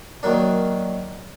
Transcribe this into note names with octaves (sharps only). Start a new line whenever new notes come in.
D#3 F#3 A#3 D4